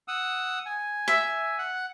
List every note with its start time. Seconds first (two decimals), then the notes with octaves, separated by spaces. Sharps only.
0.08 F#5 D#6 E6
0.66 G#5
1.08 E5
1.59 F#5